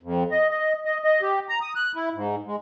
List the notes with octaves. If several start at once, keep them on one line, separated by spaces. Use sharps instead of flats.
F2
D#5
D#5
D#5
D#5
G4
A#5
D#6
F#6
E4
G#2
G#3